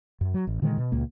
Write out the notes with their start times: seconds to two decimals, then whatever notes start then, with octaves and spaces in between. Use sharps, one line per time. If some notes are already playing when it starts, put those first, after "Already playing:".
0.21 F#2
0.34 F#3
0.47 A1
0.62 A#2 D3 D#3 G#3
0.78 B2
0.92 C#2 A#2 A#3